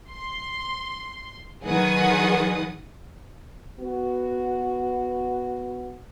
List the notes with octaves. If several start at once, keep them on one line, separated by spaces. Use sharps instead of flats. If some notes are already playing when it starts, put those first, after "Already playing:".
C6
D#3 F#3 G#4 B4 F#5 D#6
B3 F#4